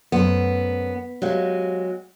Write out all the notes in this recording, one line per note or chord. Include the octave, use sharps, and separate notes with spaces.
F#2 A3 B3 C5
F#3 G#3 G4 C5 F5